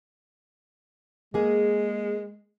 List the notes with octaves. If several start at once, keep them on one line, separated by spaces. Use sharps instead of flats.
G#3 A#3 G#4